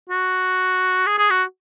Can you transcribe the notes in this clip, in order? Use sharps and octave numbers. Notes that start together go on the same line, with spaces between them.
F#4
G#4
G#4
F#4